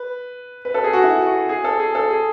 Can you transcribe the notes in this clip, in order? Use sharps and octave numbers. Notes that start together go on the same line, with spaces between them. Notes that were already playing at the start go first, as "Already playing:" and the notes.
Already playing: B4
B4
A4
G#4
F#4
E4
F#4
G#4
A4
G#4
A4
G#4